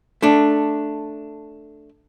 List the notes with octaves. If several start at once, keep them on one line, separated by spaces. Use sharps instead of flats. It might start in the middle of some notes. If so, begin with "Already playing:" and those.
A3 D4